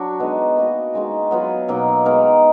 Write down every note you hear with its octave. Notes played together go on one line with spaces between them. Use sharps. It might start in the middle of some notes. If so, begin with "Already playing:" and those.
Already playing: F#3 D4 F#4
G#3 B3 D#4
A#3 D#4 F#4 B4
D#3 G#3 D#4 F#4
F#3 B3 F4
B2 F#3 A#3 D#4
G#3 B3 D#4 A#4